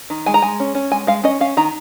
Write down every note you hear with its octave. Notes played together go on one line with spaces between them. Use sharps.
D#3
G#3 G#5
A#5
G#3 G#5
C#4
C#4
G#3 G#5
G#3 F5
C#4 D#5
C#4 F5
D#3 A#5